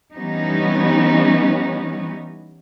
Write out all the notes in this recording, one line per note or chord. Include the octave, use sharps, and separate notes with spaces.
E3 G3 B3 C#4 D#4